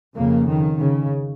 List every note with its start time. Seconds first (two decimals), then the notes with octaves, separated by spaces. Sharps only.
0.14 F2 C#3 A#3
0.47 D#3
0.80 C#3